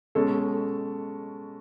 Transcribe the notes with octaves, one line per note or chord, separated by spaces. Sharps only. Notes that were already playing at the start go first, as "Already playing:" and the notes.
B2 G#3 C#4 A4